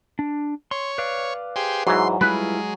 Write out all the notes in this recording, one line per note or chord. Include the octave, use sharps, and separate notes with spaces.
D4
C#5 C6
B4 D5 F5
G4 G#4 C5
G#2 E3 F#3 C6
G3 G#3 E4 F4 B4